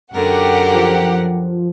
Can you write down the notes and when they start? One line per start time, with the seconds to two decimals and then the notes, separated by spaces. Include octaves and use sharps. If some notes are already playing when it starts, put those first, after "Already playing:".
0.13 F#2 D3 G4 A#4 F#5
0.73 F3